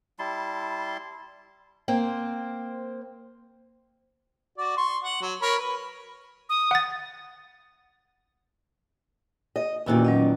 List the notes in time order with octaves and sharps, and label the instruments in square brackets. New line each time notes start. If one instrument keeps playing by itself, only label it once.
[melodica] G3 E4 A5 C6
[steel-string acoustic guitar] A#3 C4 C5
[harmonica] F#4 D5
C6 C#6
F#5
F#3
A#4 C#5 B5
B4
[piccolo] D#6
[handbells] F#5 A6
[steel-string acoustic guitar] D#5
[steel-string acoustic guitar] E2 A#2 D#3 [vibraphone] C#4 E4 F#4
[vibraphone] F#3 C#4 D#5